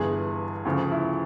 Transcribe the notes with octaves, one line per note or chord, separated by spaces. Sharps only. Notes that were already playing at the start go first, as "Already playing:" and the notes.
Already playing: G1 G2 E3 G#4
D2 C#3 F3
E4